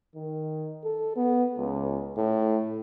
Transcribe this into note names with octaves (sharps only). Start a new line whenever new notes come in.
D#3
A4
B3
C#2
A2